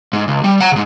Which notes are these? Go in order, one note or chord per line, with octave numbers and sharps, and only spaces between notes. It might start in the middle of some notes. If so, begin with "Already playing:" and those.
G#2
C#2
G3
F#5 A#5
G#2 C#3